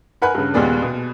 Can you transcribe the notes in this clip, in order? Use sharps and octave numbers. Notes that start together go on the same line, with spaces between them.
A#4 B4 F#5 G#5 B5 F#6
G2 C#3
D#2 A#2 G#3 B3 G#4 D5
B2